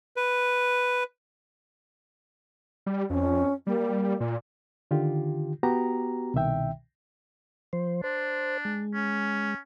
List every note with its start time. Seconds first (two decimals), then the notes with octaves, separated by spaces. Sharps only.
0.16 B4
2.86 G3
3.10 F2 C#4
3.67 G3 A#3
4.20 A#2 D5
4.91 D3 D#3 F4 G4
5.63 B3 F#4 G4 A#5
6.34 C2 B2 D#3 E5 G5
7.73 F3 C5
8.04 D4 C5
8.65 G#3
8.94 C#4